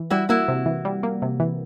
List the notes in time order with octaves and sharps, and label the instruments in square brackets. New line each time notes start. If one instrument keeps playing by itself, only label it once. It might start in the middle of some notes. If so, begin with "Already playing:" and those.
Already playing: [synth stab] E3
[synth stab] G3 [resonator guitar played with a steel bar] E4 F#4
[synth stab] A#3 [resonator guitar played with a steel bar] E4 F#4
[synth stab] C3
E3
G3
A#3
C3
E3